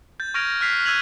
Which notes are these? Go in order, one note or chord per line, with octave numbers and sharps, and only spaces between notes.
G6 A6
C#6 F6 G#6 A#6 D7 F7
F6 F#6 B6 C7 F7
E6 F#6 G#6 D#7 F7 F#7